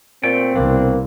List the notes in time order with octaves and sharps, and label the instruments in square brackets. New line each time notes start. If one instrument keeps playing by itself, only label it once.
[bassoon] A#2 [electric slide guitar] A3 D5 G5 [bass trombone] C4
[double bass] C2 [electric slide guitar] B2 D4 [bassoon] A#3